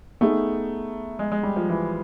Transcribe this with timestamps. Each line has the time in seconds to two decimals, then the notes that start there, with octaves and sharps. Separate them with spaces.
0.21 A3 B3 D#4 G#4
1.19 G#3
1.32 G#3
1.43 G3
1.56 F3
1.69 E3